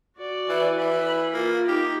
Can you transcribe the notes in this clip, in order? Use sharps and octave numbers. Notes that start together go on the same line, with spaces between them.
F#4 D5
E3
E3 B5
A#3 F4
D#4 G4